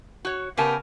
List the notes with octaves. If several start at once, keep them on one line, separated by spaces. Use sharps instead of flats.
F#4 C#5
C#3 B3 G4 A#4 G#5 A5